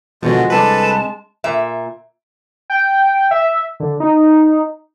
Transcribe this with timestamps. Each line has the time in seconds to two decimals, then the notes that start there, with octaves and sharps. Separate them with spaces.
0.22 B2 D3 F3 F#3 G#3 F#4
0.50 C2 D4 A4 B4 A5
1.44 A#2 E5
2.70 G5
3.31 E5
3.80 D3
4.00 D#4